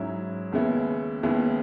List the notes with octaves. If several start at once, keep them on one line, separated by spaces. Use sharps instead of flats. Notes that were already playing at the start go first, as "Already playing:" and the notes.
Already playing: G#2 F#3 C#4 E4
D#2 C#3 G#3 B3 E4
D#2 C#3 G#3 B3 E4